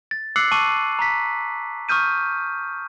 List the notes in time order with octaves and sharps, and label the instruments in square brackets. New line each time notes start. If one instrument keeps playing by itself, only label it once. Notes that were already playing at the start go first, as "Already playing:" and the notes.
[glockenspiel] A6
D6 E6 F#6 C7 C#7 F#7
A5 C#6 D6 E6 D#7 F#7
A#5 B6
C#6 D#6 F6 G6 D#7